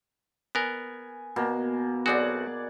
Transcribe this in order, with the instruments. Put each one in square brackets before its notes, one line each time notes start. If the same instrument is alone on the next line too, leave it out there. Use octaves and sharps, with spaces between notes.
[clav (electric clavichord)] B3 A#4 [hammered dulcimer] G#5
[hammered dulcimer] B2 A#3
[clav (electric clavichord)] B1 C4 F#4 [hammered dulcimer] G#4 D5 F#5